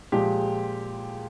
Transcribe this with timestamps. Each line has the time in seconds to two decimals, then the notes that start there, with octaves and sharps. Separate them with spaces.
0.12 A#2 F3 G#3 G4